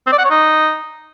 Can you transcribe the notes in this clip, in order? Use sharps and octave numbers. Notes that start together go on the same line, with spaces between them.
C4
D5
F#5
C#5
D#4